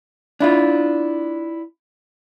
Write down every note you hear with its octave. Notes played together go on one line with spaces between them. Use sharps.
D4 E4 F4